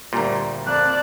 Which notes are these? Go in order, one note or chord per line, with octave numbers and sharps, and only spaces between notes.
D2 A#2 G3 A#5
F2 D5 A5 F#6